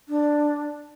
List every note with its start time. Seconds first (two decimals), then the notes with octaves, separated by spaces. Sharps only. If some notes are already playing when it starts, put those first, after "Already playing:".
0.09 D4